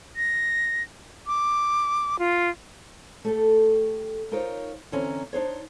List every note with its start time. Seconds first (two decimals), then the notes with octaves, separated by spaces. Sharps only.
0.16 A#6
1.27 D6
2.19 F4
3.24 A3 G4 A4
4.31 D#4 F4 A#4 C5 C#5
4.92 D3 E3 C4 C#4 A#5
5.33 D4 D#4 C5 C#5